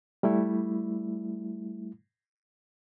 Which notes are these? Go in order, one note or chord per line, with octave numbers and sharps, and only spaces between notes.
G3 A3 E4